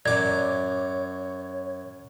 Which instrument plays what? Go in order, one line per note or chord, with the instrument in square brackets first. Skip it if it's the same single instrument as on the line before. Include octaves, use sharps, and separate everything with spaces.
[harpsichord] F#2 D6 [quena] C#5 [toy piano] D5 [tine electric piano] G#6